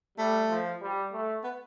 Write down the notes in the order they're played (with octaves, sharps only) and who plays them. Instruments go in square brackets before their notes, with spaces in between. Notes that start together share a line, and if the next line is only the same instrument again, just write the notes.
[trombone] G3 [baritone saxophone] A3
[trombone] F3
G3
A3
[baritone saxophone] B3